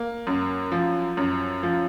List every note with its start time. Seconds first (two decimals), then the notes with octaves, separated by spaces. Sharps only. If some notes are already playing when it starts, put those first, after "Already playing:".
Already playing: A#3
0.27 F#2
0.72 F3
1.17 F#2
1.63 F3